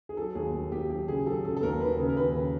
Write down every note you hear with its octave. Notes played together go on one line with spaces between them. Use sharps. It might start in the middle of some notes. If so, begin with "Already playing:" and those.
G#4
F#3 A4
D#2 G#4
D#2
D#2 G4
F#3 G4
C#3 G#4
F#3 A4
C#3 A4
A4
D#2 A#4
D#2 B4
C#3 A#4
A#4
D#2 B4
C#3